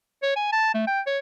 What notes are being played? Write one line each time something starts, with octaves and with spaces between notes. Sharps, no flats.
C#5
G#5
A5
A3
G5
C#5